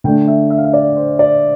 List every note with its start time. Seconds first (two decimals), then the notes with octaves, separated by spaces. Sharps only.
0.04 D3 A3 D4 G5
0.28 E5
0.50 E5
0.58 F5
0.64 E5
0.73 D5
0.96 C5
1.19 D5